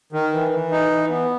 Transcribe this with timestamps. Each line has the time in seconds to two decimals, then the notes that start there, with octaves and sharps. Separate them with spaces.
0.13 D#3
0.32 E3
0.51 E3
0.71 D#4
0.89 E3
1.10 B3